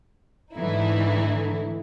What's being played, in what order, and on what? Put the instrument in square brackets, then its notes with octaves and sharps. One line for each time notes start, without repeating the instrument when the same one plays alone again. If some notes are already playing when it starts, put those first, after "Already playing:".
[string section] G#2 D3 E3 A3 D#4 E4